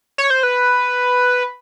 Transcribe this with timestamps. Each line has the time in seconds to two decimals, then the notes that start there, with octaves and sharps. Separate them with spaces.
0.18 C#5
0.30 C5
0.43 B4